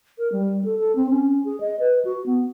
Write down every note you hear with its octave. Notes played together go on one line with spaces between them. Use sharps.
A#4
G3
A4
A4
C4
C#4
G#4
D#5
B4
F#4
B3